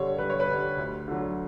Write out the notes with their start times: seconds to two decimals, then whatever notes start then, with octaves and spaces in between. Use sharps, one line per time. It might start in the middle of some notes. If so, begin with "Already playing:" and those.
Already playing: G2 D3 G3 C#5
0.18 G2 B4
0.30 C#5
0.40 B4
0.48 D3 G3
0.78 D2
1.08 D3 F#3